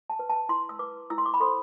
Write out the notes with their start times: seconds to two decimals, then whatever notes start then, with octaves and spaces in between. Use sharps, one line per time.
0.10 A5
0.19 B4
0.30 A5
0.49 E4 C6
0.69 E6
0.79 B4 D6
1.10 E4 E6
1.18 C6
1.26 D6
1.34 B5
1.40 A4 C5 C6